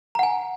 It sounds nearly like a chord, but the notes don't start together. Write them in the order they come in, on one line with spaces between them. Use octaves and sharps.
A#5 F#5 G#5